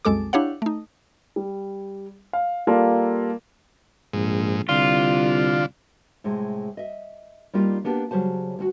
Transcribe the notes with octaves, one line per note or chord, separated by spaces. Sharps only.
C2 F#2 G#3 A4 D6
D4 E4 G4 C#5 F5 F#5
A3 D#4
G3
F5
G3 A#3 F4 A4 A#4 D5
A#1 G#2
C2 D3 F4
A2 C3 G#3
D#5 E5
G3 A#3 D4 D#4 F4 G4
A#3 B3 D4 G4
C#3 F#3 G3 C5 A5
D2 F4 F#4